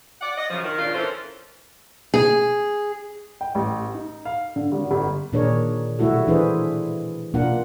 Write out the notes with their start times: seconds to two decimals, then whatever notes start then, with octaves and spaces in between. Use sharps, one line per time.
0.21 D5 F#5
0.38 D#5
0.50 F#2 C#3 F3
0.63 D#3
0.79 A#2 C#3 D4 F4
0.95 E3 C#4 A4 A#4 C5
2.14 G#4
3.41 G5
3.55 A1
3.94 D#4
4.25 F5
4.56 D3
4.72 G#1
4.91 G1
5.33 A#2 D#3 D4 G#4 A#4 C#5
5.99 B2 G3 A3 E4 F#4 A4
6.27 E3 D4 E4 G#4 B4 C5
7.34 B2 A#3 D4 F4 A#4 F#5